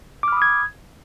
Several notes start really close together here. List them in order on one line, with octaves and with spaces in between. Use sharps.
D6 F6 B5 D#6 G#6